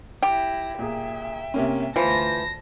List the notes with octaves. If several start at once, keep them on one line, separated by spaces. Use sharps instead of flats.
E4 G4 A#6
A#2 G#4 E5 G5
C3 A#3 C#4
D2 E3 F4 C5 A5 A#6